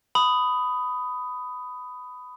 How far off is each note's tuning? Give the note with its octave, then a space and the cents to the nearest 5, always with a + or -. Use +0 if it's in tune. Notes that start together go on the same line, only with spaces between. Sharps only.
B5 +15 D#6 +0